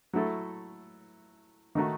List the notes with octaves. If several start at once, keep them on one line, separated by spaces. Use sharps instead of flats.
F#3 A3 E4 A4
D#3 A3 D#4 F#4